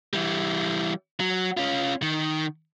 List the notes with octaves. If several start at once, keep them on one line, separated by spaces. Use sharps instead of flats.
E3 G3
F#3
C#4 F4
D#3